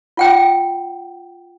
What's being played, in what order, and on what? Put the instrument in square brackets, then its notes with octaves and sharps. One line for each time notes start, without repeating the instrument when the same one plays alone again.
[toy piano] F4 F#5 G5